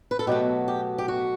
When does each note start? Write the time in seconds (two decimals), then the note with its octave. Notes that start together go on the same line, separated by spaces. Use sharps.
0.11 B4
0.19 A4
0.27 B2 F#3 A3 G4
0.68 G4
0.98 G4
1.08 F#4